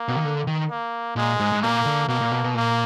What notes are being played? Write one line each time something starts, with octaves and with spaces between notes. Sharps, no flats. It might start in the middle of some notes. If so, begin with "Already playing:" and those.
Already playing: A#3
B2
D#3
D3
D#3
A#3
A#2 G#3
G#2
G#2
A#2 A#3
D3
B2 A#3
A#2
B2
B2
A#2 A#3